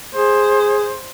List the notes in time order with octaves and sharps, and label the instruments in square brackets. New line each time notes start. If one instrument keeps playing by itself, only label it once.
[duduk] G#4 [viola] C5